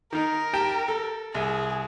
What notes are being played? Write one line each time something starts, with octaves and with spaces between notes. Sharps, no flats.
D#3 D#4 A#4
G4 G5 A5
A4
C2 G#4